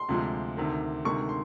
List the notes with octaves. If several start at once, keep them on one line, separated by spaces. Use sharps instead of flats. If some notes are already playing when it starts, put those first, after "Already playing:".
Already playing: C6
D2 C3 F3 G#3
D2 C3 D#3
D2 C3 D#3 G#3 C#6
C6